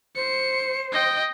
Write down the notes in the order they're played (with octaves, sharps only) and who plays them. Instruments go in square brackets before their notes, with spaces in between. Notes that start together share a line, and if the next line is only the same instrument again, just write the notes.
[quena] C5 [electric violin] C#7
[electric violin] D#5 G5